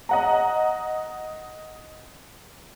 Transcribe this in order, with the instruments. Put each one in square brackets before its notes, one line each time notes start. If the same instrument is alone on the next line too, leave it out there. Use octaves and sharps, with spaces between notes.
[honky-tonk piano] D#5 F#5 A#5